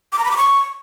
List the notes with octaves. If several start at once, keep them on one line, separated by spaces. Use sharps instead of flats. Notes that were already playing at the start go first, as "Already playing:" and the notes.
D6
A#5
B5
D6
C#6